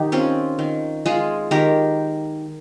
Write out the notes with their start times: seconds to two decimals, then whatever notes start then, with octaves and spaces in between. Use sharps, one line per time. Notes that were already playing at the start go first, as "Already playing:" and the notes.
Already playing: D#3 D#4 G4
0.12 C4 C#4 F4
0.59 D#3
1.06 G#3 F4 G#4
1.51 D#3 G4 A#4